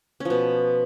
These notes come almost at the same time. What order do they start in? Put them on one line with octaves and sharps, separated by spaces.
C#4 F3 B2